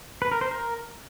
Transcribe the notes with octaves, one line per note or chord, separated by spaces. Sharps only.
B4
A#4
C5
A#4